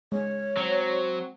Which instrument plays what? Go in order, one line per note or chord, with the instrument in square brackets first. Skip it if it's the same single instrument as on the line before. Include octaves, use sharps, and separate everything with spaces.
[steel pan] G#3 [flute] C#5
[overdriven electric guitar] F#3 [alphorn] C4